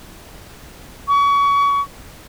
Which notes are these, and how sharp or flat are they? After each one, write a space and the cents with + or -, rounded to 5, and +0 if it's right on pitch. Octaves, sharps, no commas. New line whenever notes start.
C#6 +30